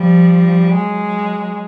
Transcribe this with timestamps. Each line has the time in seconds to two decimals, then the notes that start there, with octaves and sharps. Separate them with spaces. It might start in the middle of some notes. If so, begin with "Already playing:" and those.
Already playing: F3 G3
0.73 F#3 G#3